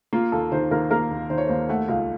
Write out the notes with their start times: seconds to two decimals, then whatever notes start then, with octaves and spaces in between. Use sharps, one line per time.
0.13 A#3 F4
0.32 D#2 A4
0.52 D#3 C5
0.71 D#2 A#4
0.91 A#3 A#4
1.11 D#2
1.30 D#3 C5
1.38 C#5
1.46 D#2 C5
1.69 A3 F#5
1.88 C#2 F5